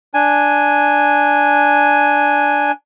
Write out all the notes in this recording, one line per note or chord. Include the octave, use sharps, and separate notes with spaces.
D4 G#5